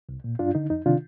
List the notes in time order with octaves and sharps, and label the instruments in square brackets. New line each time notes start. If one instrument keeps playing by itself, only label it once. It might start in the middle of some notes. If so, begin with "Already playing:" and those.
[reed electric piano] C2
A#2
G2 D4 F4
D3 D#4
F2 D#4
C3 D#3 D4 F4